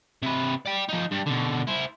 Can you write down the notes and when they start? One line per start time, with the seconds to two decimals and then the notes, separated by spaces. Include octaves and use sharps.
0.22 C3 B4
0.66 D5 G5
0.89 F3 D#4
1.12 G2 G3
1.27 B2 D3
1.68 E4 C5